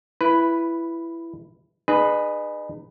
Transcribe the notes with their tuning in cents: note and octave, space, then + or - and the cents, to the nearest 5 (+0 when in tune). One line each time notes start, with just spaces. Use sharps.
E4 +15 B4 +0
D#4 -40 G#4 +0 B4 +0